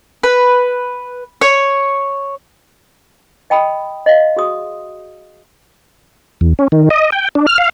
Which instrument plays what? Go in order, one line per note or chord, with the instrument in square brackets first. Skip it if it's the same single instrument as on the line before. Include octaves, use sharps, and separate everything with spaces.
[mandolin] B4
C#5
[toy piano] D#5 G5 A5 B5 D#6
D#5 F5
F#4 G#4 C6 D#6
[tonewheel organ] E2
C#4
D#3
D#5
G5
D4
F6
F5